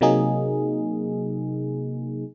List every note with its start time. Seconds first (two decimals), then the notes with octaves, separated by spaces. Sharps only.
0.01 C3 F#3 A#3 D#4 G#4